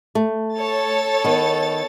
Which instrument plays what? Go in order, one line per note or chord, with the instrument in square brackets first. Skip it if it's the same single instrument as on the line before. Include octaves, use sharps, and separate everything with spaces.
[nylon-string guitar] A3
[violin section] A4 C#5 A6
[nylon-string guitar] D#3 B3